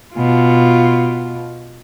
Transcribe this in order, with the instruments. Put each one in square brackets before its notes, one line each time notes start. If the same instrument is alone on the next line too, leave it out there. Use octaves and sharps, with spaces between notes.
[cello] B2 F4